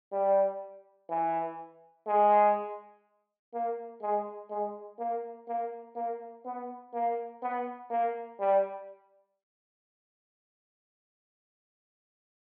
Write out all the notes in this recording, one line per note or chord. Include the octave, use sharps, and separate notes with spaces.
G3
E3
G#3
A#3
G#3
G#3
A#3
A#3
A#3
B3
A#3
B3
A#3
G3